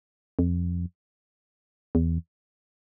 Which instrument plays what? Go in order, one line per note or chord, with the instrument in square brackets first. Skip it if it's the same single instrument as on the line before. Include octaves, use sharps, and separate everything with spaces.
[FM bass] F2
E2